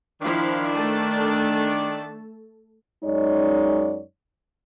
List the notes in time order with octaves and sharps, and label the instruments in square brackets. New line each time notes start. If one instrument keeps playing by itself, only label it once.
[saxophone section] D#3 D4 [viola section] F3 E4 F5
[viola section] A3 A4 A5
[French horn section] F#2 G#3 D#4 C#5 D5